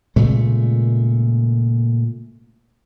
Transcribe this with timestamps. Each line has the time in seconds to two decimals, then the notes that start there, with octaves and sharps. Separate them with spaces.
0.16 A#2 C#3 G#3 A3